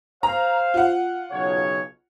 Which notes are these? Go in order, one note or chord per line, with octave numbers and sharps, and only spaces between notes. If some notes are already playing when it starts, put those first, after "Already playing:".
C5 F5 A#5
F4 F#5
B1 C#3 C#5